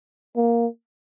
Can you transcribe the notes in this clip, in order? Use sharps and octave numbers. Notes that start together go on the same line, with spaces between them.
A#3